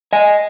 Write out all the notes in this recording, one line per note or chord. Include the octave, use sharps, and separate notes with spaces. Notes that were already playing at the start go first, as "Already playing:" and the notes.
D#5 G#5